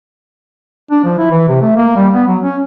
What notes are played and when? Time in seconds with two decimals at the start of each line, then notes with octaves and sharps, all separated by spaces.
0.91 D4
1.04 F3
1.18 E4
1.31 E3
1.48 C3
1.61 A3
1.76 A#3
1.96 G3
2.13 B3
2.27 F#3
2.42 C#4